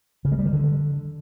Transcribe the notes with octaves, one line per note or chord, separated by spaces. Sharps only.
C#3
G#3
G3
D#3
D3